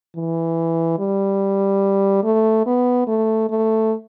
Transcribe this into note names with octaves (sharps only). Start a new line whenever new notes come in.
E3
G3
A3
B3
A3
A3